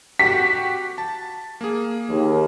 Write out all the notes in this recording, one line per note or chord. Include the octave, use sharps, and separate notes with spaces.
F#4 G4 F#5 B6
A5
A#3 G#4
D#2